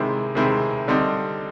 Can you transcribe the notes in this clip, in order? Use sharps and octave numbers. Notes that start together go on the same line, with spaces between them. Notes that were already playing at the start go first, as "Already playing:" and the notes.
Already playing: C3 D#3 G#3 C4 E4
C3 D#3 G#3 C4 E4
D3 G3 C4 D#4